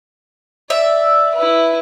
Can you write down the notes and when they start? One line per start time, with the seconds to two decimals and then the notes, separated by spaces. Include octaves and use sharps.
0.70 D5 E5
1.35 E4 B4